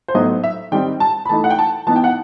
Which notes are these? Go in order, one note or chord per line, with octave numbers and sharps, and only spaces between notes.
C5
A2 F#3 B3 D#4 D#5
E5
D#3 G3 C4 D#4 G5
A5
B5
E3 A3 D#4 A5
F#5
G5
A5
E3 B3 D#4 A5
G5
F#5